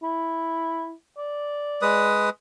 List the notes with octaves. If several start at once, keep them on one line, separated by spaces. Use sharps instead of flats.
E4
D5
G#3 B4 D#6